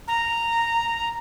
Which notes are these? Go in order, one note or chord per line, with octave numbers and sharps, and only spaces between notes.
A#5